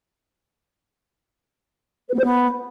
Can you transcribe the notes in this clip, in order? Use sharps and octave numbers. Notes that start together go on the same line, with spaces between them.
B4
B3
C5
B3